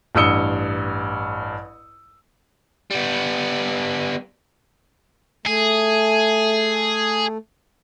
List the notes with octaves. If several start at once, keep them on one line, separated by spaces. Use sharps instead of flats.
A1 G2 D#6 E6 C#7 G7
G3 B3
A3 G#4